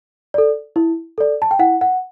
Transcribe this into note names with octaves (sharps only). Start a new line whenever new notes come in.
A4 D5
E4
A4 D5
A5
G5
E4 F#5
F#5